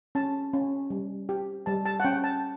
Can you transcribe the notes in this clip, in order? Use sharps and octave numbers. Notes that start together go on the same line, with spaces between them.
C#4 A5
C#4
G3
G4
G3 A5
A5
F#5
C#4 G5
A5